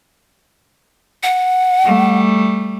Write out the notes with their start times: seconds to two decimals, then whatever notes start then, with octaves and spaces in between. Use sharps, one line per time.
1.23 F#5
1.85 G3 A3